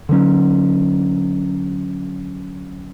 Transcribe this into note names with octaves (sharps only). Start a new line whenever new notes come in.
D3 F#3 C#4